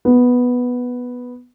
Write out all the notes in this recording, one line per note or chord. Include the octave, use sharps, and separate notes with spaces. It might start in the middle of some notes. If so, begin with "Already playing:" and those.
B3